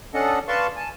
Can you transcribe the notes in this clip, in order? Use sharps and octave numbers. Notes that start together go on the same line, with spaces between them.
C#4 D4 A4 D#5 F#5
B4 D5 F5 A5 C6 C#6
G#5 A5